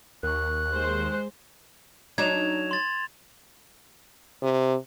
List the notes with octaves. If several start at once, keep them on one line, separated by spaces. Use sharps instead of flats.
D#2 A#4 C#6 F#6
G#3 C5
F#3 D4 D#4 G#6 E7 F7
C6 A6
C3